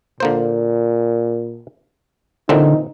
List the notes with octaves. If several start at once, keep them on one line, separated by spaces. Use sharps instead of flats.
A#2 D3 A#3 C5
A#2 D3 E3 C4 D#4